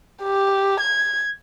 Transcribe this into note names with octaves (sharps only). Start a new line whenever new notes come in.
G4
G#6